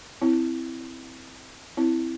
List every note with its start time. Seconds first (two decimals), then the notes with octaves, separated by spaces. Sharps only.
0.22 C4 E4
1.77 C4 E4